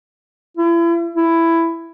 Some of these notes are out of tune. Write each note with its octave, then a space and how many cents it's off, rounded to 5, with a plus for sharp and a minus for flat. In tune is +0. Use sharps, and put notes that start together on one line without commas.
E4 +35
E4 +10